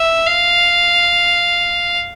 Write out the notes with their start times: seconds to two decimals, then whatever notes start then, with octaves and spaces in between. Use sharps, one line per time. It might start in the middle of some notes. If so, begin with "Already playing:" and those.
Already playing: E5
0.26 F5